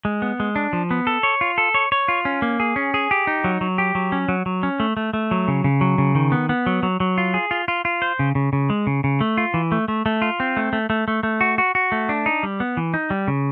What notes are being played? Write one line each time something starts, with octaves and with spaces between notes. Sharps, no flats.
G#3
B3
G#3
D4
F3
B3
A4
C#5
F4
A4
C#5
C#5
F4
C#4
A#3
G#4
C#4
G#4
G4
D#4
F#3
F#3
G4
F#3
C#4
F#3
F#3
C#4
A3
A3
A3
F#3
C#3
C#3
F#3
C#3
D#3
B3
B3
F#3
F#3
F#3
F4
G#4
F4
F4
F4
C5
C#3
C#3
C#3
G#3
C#3
C#3
A3
F4
E3
A3
A3
A3
F4
C4
A3
A3
A3
A3
A3
F#4
F#4
F#4
A3
D4
D#4
G3
B3
E3
D#4
G3
C#3